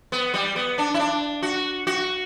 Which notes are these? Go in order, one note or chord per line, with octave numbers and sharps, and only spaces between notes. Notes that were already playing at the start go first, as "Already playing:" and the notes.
B3
G3
B3
D4
E4
D4
F#4
F#4